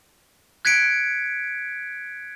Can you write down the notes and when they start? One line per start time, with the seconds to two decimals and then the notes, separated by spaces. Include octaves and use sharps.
0.65 F#6 G#6 B6 C#7 D7